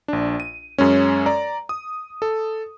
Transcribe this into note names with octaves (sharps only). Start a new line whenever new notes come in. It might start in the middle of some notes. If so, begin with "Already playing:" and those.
A#1 D4
D#7
F#2 G#3 C#4
D5 A#5
D#6
A4